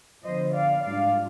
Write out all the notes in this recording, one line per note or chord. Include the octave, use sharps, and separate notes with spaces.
D3 F3 B3 C5 D#5
D5 F5
G#2 G3 D4 F4 D5 F5